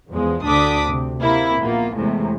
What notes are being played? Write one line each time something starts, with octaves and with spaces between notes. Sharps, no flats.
E2 F3 G#3
D2 D3 D4 D6 D#6 B6
C3
C3 A#3 E4
A#1 A#3 B3 F4
E2 A2 C3 G#3